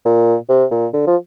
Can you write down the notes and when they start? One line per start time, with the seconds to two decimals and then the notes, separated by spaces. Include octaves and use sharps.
0.05 A#2
0.49 C3
0.71 A#2
0.93 D3
1.07 F3